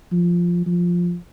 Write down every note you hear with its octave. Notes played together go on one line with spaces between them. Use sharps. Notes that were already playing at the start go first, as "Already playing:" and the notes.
F3
F3